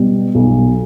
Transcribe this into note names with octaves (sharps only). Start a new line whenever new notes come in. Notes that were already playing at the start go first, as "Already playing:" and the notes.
Already playing: B2 G3
B1